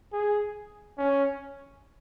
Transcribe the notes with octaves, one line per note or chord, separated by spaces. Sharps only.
G#4
C#4